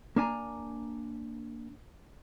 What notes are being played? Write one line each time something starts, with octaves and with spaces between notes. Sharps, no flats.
A#3 D4 G#5 A#5